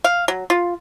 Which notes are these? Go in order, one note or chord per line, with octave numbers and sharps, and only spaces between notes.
F5
F#3
F4